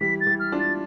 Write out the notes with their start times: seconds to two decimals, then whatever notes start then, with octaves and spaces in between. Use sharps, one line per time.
0.01 E3 G3 B6
0.21 A6
0.27 E3 G3
0.40 F6
0.52 D4 F4
0.59 A6